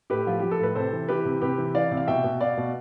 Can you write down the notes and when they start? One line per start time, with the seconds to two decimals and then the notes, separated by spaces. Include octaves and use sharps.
0.10 A2 G4 B4
0.27 F3 F4
0.39 F3 G4
0.51 A4
0.60 A2 B4
0.75 C3 A4 C5
0.93 E3
1.08 E3 G4 B4
1.25 C3
1.42 C3 G4 B4
1.58 E3
1.75 E3 D5 F5
1.91 C3
1.97 F5
2.07 B2 E5 G5
2.24 B2
2.40 B2 D5 F5
2.57 B2